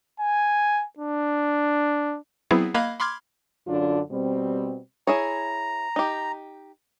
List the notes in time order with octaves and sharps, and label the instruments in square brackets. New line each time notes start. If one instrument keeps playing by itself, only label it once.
[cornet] G#5
D4
[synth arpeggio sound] F#3 B3 C4 E4 G#4
A#3 D#5 F5 B5 F#6 G#6
B5 C6 D6 F6 G#6
[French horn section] F#2 D3 D4 F4
B2 G3 C4
[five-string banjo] E4 G#4 C#5 [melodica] A#5
[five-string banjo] D#4 G4